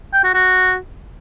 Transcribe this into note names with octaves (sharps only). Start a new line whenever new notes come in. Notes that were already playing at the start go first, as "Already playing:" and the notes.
G5
F#4
F#4